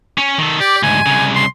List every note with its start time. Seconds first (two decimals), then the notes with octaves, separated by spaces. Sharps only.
0.18 C#4
0.39 D#3 A4
0.60 G4 D5
0.83 D2 G#2 G#5
1.06 C2 C#3
1.35 C6